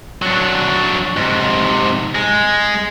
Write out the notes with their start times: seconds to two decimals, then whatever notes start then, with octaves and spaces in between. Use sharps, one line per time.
0.22 F#3 D4
1.17 G#2 C3
2.15 G#3